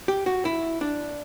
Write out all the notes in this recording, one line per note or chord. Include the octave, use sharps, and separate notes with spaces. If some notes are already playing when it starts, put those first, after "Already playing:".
G4
F#4
E4
D4